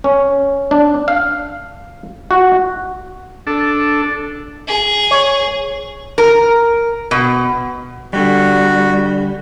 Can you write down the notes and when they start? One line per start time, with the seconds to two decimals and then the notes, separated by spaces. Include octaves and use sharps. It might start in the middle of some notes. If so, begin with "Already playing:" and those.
0.04 C#4
0.71 D4
1.08 F5
2.31 F#4
3.47 D4 A4
4.68 G#4
5.11 C#5
6.18 A#4
7.11 B2
8.13 D3 G3 F#4